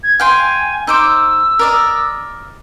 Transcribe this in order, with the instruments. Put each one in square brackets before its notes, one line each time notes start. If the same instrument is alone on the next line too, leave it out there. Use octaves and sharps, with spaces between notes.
[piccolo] G#6
[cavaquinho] F5 G5 C6 [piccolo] G#5
[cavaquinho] D#4 C5 D6 [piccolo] E6
[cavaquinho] A#4 D5 D#5